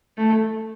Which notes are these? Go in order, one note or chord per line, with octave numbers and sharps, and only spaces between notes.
A3